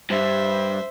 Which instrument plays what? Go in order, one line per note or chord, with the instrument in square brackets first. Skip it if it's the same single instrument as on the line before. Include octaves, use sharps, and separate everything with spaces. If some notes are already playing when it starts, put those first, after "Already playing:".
[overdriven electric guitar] G2 [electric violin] C5 E5